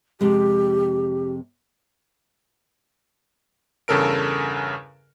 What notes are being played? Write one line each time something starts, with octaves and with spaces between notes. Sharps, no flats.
F2 C3 G#3 G4
E2 G2 C#3 A4 A#4 D7